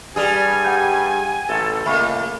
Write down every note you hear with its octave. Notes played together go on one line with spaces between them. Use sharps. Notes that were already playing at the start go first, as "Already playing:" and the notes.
G2 G3 G#4 G#5
F#5 G5 G6
A1 A4
C#2 A3 A#3 E5 B5 C#6